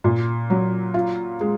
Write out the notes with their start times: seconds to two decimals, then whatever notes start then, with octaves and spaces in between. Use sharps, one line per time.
0.04 A#2
0.50 F#3
0.94 F4
1.41 G#3